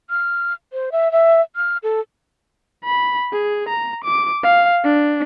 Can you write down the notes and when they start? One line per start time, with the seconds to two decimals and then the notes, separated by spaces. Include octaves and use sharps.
0.10 F6
0.73 C5
0.92 E5
1.12 E5
1.56 F6
1.83 A4
2.84 B5
3.33 G#4
3.69 A#5
4.04 D6
4.43 F5
4.84 D4